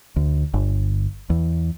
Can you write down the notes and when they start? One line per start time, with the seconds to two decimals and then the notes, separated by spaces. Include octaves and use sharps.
0.16 D2
0.54 G1
1.30 E2